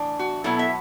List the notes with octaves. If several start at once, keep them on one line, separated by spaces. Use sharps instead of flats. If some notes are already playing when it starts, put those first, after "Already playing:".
Already playing: A2 E3 D4
F#4
B2 F#3 B3 E4 A4
E5